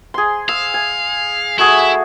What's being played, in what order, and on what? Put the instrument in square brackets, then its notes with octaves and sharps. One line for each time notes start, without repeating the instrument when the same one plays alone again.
[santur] G#4 C6
[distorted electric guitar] F5 [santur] E6
[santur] G#5
[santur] A3 F#4 G#4 [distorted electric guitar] E4